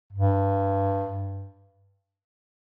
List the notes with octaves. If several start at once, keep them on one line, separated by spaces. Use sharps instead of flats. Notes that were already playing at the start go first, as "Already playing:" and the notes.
G2